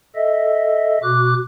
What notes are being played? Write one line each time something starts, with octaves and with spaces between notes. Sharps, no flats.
A4 D#5 E5
B2 F#4 D6 F#6